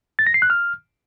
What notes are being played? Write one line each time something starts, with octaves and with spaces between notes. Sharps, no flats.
A6
A#6
C7
F#6
F6